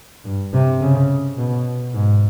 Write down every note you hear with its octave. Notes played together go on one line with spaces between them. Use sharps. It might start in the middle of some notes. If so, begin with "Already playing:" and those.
G2
C3
C#3
B2
G#2